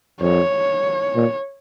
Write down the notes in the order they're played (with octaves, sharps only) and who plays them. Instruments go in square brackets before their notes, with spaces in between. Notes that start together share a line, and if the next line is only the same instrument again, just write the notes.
[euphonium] F2 [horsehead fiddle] C#5
[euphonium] A#2